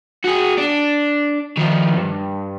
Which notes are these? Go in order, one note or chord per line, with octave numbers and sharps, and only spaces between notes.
F#4 G#4
D4
D#3 F3
G2